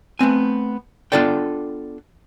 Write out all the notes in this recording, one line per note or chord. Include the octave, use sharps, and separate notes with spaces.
A3 B3 C4 G#5
B3 D4 F4 A4 D5 G5